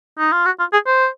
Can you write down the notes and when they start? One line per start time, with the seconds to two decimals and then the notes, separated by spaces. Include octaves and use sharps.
0.19 D#4
0.32 F4
0.45 F#4
0.59 F4
0.73 G#4
0.87 C5